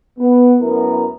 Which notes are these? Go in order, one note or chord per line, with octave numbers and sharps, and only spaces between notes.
B3
F#2 A3 B3 E4 A#4